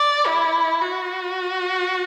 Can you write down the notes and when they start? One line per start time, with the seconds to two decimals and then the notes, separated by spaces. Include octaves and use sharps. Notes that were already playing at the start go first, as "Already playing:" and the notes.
Already playing: D5
0.27 E4
0.82 F#4